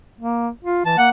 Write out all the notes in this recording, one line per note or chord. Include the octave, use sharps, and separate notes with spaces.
A#3
F4
E3 A5
A#3 F#5